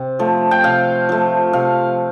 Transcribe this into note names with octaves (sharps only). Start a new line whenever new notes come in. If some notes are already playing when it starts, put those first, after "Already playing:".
Already playing: C3
F3 A3
G5
C3 F5
F3 A3
C3 F5